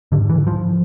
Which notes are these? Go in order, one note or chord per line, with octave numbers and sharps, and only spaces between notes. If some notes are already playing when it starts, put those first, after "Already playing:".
G#2 D3
E3
F3